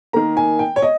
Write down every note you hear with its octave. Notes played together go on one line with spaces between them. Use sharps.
D#3 A#3 A#5
G#5
G5
C#5
D#5